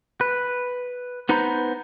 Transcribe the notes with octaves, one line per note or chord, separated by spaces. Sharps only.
B4
B3 D#4 B4 C5 A#5 B5